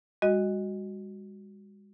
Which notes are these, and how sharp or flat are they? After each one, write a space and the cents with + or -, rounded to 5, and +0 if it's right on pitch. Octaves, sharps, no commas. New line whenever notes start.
G#3 -45 F#4 +0 D#5 +0